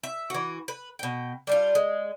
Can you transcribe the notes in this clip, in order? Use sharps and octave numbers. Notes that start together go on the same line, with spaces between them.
E5
E3 F#4
B4
B2 G5
G3 D4 F4
G#3